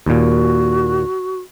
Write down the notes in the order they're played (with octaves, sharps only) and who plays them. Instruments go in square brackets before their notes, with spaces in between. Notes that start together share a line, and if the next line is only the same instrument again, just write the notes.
[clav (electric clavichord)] D#2 A#2 [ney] F#4